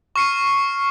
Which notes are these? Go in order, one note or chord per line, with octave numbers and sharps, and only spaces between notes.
C#6 F6 C7 C#7 D#7